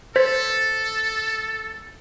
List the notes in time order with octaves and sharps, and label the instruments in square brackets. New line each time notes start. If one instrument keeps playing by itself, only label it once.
[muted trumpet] A4 [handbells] C5 G#6 B6